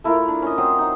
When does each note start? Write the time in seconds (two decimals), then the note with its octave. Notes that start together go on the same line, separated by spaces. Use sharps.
0.04 A3 E4 F4 A#4
0.28 D4
0.42 C#4 D#5
0.58 F#3 C4 C5 D#6
0.79 D#4